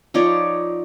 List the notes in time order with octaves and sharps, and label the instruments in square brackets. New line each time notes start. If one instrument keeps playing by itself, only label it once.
[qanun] F3 D#4 C#5 D5